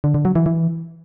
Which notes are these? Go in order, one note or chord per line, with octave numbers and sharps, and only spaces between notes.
D3
D3
F#3
E3
E3